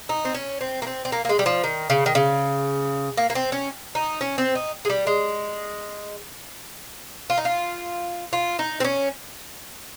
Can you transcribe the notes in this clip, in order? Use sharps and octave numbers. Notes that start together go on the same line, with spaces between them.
D#4
C4
C#4
C4
A#3
C4
C4
A#3
A#3
G#3
G3
F3
D#3
C#3
D#3
C#3
A#3
A#3
C4
C#4
D#4
C#4
C4
D#4
G#3
G3
G#3
F4
D#4
F4
F4
D#4
C4
C#4